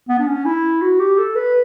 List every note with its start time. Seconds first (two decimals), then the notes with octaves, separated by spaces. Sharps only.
0.09 B3
0.19 D4
0.27 C#4
0.46 E4
0.82 F#4
0.99 G4
1.18 A4
1.36 B4